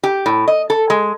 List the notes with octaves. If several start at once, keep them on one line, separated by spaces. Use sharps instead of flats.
G4
A2
D#5
A4
G#3